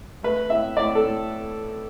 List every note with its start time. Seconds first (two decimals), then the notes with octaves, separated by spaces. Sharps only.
0.23 A3 B4
0.50 A2 E5
0.77 A2 D5
0.95 A4
1.04 A2